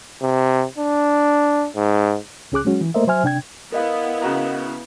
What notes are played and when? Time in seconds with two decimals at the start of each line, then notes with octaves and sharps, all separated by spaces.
0.22 C3
0.78 D4
1.76 G#2
2.52 C#2 C#4 G#4 D6 F#6
2.65 F#3 G#3 C#4 F#4
2.81 E3
2.94 A3 A#3 A#4 C5 D#5 E5
3.07 F#3 C5 E5 G#5 F6
3.23 C3 D4 G5 G#6
3.72 B3 E4 A#4 D#5 F5
4.22 C#3 F#4 A#5